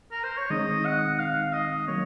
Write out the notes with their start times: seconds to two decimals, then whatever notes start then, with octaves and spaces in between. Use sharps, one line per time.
0.12 A#4
0.24 C5
0.38 C#5
0.50 D#3 G#3 C4 D#4 D#5
0.85 F#5
1.19 F5
1.53 D#5
1.88 F#3 A#3 C#5